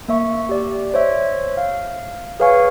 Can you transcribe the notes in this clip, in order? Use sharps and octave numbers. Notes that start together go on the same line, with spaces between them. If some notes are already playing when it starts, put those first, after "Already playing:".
A#3 E5 C#6
G4 D5
C5 C#5 E5
F5
G#4 B4 C#5 F5 G#5 C#6